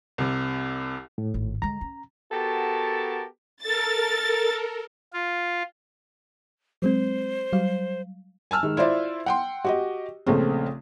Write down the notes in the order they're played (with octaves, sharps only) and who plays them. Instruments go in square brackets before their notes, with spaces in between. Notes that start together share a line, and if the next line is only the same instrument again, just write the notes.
[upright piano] C2 C3
[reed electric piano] A2
[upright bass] G#1
[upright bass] D3 G#3 [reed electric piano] A#5
[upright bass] C#4
[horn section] B3 F#4 G4 A4 A#4 A5
[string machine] A4 A#4 [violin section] A6
[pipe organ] F4
[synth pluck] F#3 G#3 C4 [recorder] C5
[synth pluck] F#3 G3 F5
[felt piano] G#5 A5 E6 F6
D#3 G#3
E4 F4 C5 D5 E5
F#5 G5 C6
F#4 G4 D#5
A#1 C#3 A3 C4